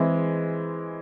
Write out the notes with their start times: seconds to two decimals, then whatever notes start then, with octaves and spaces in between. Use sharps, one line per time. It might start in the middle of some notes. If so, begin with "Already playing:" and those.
Already playing: E3 G#3 C4 E4